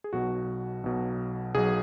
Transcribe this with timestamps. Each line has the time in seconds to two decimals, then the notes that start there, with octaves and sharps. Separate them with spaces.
0.04 G#4
0.13 B1 B2 F#3 F#4
0.84 B1 B2 F#3
1.54 B1 B2 F#3 G#4